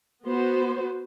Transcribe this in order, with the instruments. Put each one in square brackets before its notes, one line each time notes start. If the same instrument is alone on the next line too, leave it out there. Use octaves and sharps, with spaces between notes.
[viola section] B3 F#4 C5